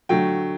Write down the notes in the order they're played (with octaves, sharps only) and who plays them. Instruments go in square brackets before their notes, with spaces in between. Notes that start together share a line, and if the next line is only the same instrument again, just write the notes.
[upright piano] D3 F#3 A3 G5